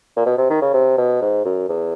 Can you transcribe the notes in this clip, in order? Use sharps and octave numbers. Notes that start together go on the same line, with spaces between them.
A#2
B2
C3
D#3
C#3
C3
B2
G#2
F#2
E2